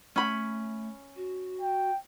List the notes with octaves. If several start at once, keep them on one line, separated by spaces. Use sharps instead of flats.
A3 C#4 B5
F#4
G5